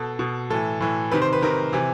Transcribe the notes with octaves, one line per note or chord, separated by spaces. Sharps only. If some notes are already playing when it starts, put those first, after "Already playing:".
Already playing: B2 A4
B2
A2 E3 A4
A2 E3
C3 D#3 B4
C5
B4
C3 D#3 A#4
C3 E3